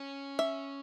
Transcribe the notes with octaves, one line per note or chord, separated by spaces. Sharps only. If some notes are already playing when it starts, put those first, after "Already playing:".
Already playing: C#4
E5